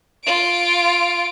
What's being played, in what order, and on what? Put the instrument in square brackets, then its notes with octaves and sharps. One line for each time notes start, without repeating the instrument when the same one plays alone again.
[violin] F4 D7